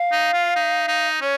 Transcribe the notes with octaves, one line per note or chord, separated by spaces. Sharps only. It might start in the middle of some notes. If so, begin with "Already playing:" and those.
Already playing: F5
D#4
F4
D#4
D#4
C#4 C#5